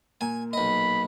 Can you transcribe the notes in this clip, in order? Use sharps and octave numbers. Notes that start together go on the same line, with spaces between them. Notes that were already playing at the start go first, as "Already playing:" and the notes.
A#2 A#3 G#5
B1 D#5 B5